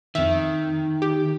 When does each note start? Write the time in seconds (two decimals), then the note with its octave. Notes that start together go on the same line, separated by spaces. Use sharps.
0.15 F2 D#3 E5
1.02 G4